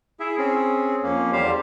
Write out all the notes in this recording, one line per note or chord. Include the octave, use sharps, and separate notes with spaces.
E4 G#4 E5
C4 C#4 G#4
F2 A#3 C#4
E2 G3 G4 C5 F5